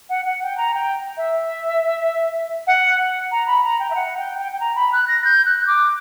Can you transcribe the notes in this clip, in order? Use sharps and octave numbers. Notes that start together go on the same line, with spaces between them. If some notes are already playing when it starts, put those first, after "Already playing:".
F#5
F#5
G5
A#5
G5
E5
F#5
A#5
B5
A#5
G5
E5
F#5
G5
G5
G5
A#5
B5
F#6
A#6
G6
F#6
D6